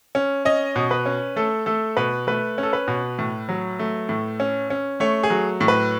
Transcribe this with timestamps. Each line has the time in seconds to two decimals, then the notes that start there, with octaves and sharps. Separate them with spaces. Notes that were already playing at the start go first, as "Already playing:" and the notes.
0.15 C#4
0.45 C#4 D#5
0.76 B2
0.91 B4
1.06 C#4
1.36 A3 A4
1.66 A3 A4
1.97 B2 B4
2.27 A3 B4
2.58 C#4
2.63 A4
2.73 B4
2.88 B2
3.19 A2
3.49 F#3
3.79 A3
4.09 A2
4.40 C#4
4.70 C#4
5.00 A3 C#5
5.23 G#4
5.30 F#3
5.61 A2
5.68 B4